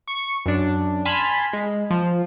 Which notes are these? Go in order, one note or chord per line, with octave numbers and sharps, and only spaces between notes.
C#6
F#2 D4
G#5 A5 B5 C6 F6
G#3
F3